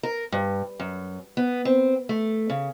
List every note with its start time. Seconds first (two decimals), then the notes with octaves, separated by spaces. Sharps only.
0.03 A#4
0.32 G2
0.80 F#2
1.37 B3
1.65 C4
2.09 A3
2.50 C#3